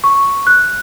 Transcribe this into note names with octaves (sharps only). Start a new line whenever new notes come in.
C#6
F#6